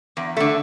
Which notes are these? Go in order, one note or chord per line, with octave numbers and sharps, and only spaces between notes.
E2
D3 A3